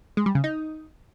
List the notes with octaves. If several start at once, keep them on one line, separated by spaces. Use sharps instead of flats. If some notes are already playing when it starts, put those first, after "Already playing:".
G#3
G3
C#3
D#4